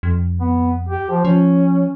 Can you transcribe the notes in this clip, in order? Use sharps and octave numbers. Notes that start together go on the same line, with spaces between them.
F2
B3
G4
F3
F3 C#4